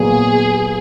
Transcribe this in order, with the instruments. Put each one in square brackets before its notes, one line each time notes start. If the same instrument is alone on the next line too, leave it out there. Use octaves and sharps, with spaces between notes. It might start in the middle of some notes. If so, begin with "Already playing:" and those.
Already playing: [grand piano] A#2 F#3 B3 [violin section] G#4